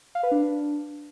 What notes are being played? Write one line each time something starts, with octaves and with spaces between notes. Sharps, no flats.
F5
B4
D4